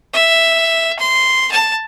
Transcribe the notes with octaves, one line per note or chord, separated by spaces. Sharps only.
E5
C6
A5